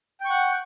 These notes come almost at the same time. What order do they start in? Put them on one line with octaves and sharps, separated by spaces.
G5 C#6 F#5